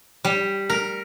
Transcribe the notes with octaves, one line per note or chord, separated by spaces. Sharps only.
G3
A#4